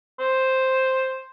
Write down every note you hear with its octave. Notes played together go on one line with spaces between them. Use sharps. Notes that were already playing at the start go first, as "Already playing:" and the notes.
C5